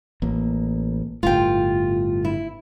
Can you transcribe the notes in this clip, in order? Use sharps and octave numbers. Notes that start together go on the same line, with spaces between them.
A1 A#3
G1 A2 F4 G5
E4